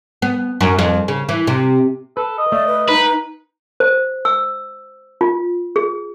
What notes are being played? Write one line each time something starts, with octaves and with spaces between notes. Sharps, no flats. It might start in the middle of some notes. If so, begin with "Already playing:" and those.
B3
F#2
F2
C#3
E3
C3
A4 B4
D#5
A3 D5
B4
D#4 B4
C5
E6
F4
G#4